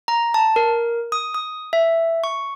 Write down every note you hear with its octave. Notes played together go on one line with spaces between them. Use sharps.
A#5
A5
A#4
D#6
D#6
E5
C#6